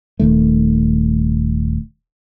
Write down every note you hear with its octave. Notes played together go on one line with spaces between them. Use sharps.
D#1 D#3 A3